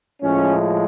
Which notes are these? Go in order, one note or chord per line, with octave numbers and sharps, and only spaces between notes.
A2 F3 G#3 C#4